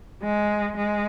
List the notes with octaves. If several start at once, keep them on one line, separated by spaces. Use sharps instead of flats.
G#3
G#3